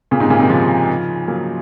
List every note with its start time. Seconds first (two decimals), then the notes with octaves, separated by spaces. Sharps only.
0.11 A#2 C#3
0.20 G#2 C3
0.30 A#2 C#3
0.40 C3 D#3
0.49 C#3 F3
1.28 F#3 A#3